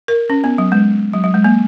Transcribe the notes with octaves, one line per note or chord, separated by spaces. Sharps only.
A#4
C#4
B3
F#3
G#3
F#3
F#3
G#3
A#3